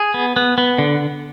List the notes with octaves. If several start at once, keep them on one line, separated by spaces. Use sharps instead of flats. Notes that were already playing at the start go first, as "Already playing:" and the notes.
Already playing: G#4
B3
B3
B3
D3